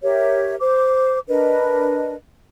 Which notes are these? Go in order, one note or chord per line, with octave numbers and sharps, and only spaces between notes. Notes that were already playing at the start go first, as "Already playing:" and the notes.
G4 A#4 C#5 E5
C5 D6
D4 A#4 B4 D#5